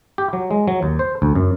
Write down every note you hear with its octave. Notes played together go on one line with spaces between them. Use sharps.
G4
F#3
G#3
F#3
D#2
C5
D2
F#2